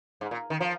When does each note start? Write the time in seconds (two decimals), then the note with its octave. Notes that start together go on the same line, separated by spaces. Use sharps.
0.21 G#2
0.31 A#2
0.50 D#3
0.60 F3